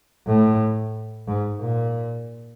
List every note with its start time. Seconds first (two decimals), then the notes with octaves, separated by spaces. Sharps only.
0.27 A2
1.27 G#2
1.60 A#2